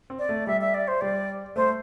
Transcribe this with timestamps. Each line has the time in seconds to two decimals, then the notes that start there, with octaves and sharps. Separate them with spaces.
0.10 C4
0.19 D5
0.29 A3
0.47 G3 E5
0.61 E5
0.74 D5
0.88 C5
1.01 G3 D5
1.56 A3 C5